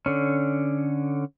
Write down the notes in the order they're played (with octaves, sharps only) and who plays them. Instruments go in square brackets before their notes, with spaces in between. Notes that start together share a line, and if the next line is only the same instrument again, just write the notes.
[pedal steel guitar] D3 C#4